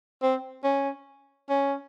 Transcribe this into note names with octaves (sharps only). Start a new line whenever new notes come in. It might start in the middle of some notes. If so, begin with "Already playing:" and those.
C4
C#4
C#4